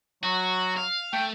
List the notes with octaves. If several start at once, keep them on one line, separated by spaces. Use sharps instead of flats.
F#3 F#4
F5
A3 G5